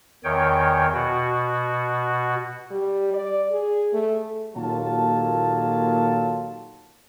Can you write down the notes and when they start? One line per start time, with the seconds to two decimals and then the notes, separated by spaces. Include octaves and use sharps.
0.24 E2 D#3 C#5 G5
0.94 B2 F#4
2.71 G3
3.14 D5
3.51 G#4
3.94 A3
4.56 D#2 A#2 F#3 F4 A4 A5